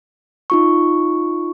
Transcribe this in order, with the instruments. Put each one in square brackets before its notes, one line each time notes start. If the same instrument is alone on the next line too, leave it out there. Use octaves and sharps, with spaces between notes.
[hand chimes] D#4 F4 C#6